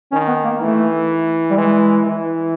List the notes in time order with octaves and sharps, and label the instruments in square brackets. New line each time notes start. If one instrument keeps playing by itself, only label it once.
[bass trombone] D#3 [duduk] C#4
[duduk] B3
A#3
[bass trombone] E3 [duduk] A3
[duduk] G3
[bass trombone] E3 [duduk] G#3
[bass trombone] E3